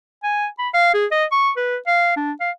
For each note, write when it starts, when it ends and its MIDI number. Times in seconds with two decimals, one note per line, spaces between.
0.24 0.47 80
0.59 0.69 83
0.74 0.92 77
0.94 1.05 68
1.11 1.24 75
1.31 1.50 85
1.57 1.76 71
1.87 2.15 77
2.16 2.32 62
2.40 2.51 77